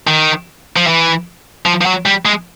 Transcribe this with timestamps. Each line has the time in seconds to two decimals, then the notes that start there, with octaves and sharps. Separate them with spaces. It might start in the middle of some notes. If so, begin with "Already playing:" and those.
0.07 D#3
0.77 F3
0.87 E3
1.66 F3
1.81 F3
1.86 F#3
2.06 G3
2.26 G#3